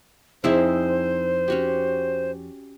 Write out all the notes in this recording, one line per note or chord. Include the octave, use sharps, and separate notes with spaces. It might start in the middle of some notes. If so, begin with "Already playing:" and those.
F2 C4 D#4 E4 G#4 C5
C#4 F#4 G4